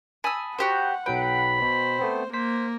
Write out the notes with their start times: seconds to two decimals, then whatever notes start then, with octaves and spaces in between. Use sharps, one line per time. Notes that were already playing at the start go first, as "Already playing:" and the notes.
0.24 G#5 A5 B5 D#6 E6
0.59 F#4 G4 C5 F#5
1.06 B1 F#3 B4 G5 B5
1.62 B2 C5
1.99 A3 B3 C4
2.34 A#3 C5 B6